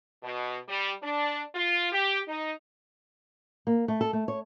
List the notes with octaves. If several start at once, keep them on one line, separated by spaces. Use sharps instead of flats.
B2
G3
D4
F4
G4
D#4
A#3
A3
A4
A3
C#5